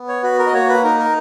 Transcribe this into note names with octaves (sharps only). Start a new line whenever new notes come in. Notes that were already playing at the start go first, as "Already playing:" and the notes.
Already playing: B3
C#5
F#4 B4
A#4
D#5
A#3 C#5
B4
D#4 A#4
A#4